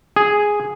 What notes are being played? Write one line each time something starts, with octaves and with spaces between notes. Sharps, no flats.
G#4